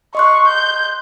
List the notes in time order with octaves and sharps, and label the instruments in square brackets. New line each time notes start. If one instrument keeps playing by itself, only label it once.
[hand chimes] D#5 C6 F#6 [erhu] C#6
[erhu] G6